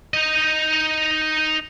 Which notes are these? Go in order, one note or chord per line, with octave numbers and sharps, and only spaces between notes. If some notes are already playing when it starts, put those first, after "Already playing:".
D#4 D#5